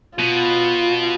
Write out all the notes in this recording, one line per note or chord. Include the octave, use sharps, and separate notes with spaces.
B2 F4